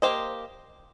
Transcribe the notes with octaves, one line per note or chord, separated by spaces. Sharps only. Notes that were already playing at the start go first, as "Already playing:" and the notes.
A#3 G4 C5 D#5